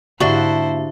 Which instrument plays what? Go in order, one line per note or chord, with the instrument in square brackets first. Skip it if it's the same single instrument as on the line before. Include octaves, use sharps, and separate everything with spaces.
[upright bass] G#2 A#3 [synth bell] D3 E5 [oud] D4 F#4 [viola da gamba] E4 C5